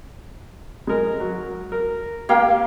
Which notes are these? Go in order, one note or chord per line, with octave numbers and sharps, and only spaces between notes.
G#3 A#4
F#3
A#4
A#3 G4 F5 G5